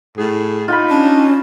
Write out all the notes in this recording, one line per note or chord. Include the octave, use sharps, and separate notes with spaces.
A2 G#4
D#4 F4 G5 B5
C#4 D4